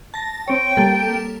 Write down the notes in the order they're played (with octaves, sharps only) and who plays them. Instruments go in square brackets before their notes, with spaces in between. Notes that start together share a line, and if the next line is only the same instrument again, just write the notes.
[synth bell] A5 A#6
[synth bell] C4 C#5 [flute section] G5
[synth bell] G3 A#3 A4